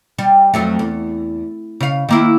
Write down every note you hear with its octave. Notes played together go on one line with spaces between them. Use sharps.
G3
F2 F#3 A3
E2
C#3 F5
D#3 A#3 E4